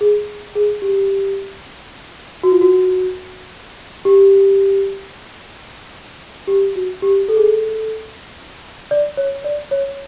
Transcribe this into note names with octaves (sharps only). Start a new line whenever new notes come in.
G#4
G#4
G4
F#4
F4
F#4
G4
G4
F#4
G4
A4
G#4
A4
D5
C#5
D5
C#5